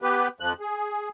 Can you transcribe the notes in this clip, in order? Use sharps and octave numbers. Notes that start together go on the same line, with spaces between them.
B3 G4 B4
F2 F3 F#6
G#4